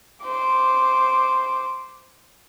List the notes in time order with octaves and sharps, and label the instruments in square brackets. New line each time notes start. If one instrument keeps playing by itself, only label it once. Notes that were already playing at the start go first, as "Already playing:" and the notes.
[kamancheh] C5 D6